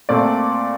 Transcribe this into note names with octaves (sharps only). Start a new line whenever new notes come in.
A#2 A3 C4 D5